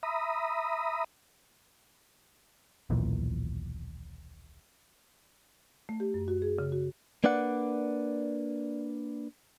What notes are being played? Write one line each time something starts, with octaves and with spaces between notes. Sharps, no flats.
E5 A#5 B5 D#6
D#1 B1 A#2 E3
A3
G4
F#2
F#4
G#4
C#3
F#4
A#3 D4 B4 D5 F#5